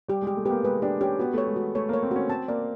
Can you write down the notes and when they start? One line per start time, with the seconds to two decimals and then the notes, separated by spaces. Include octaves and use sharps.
0.08 G3 G4
0.22 G#3 G4
0.37 A3
0.45 B3 G4
0.51 A#3
0.64 G#3 B4
0.82 D4 G4
1.01 C#4 G4
1.19 B3 F#4
1.34 A3 C#5
1.47 G#3
1.56 F#4
1.75 A3 C#5
1.89 A#3 C#5
2.03 C4
2.11 C#4 F#4
2.29 C4 A5
2.48 A#3 D5